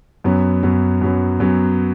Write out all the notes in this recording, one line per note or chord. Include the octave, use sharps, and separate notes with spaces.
F#2 F#3 B3
F#2 F#3 B3
F#2 F#3 B3
F#2 F#3 B3